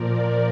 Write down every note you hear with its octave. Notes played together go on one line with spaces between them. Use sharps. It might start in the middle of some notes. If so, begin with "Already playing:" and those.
Already playing: A#2 F3 A#4 D5